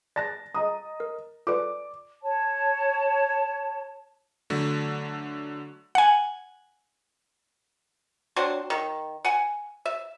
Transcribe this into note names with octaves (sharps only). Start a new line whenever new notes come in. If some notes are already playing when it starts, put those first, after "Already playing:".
D5 A5 F#6 A6 A#6
D#5 A#5 D#6
A#4
F4 A4 B4 D5 D6
C#5 A5
D3 F#3 A3
F#5 G#5
F#3 C4 D4 C5
D#3
F#5 G#5
E5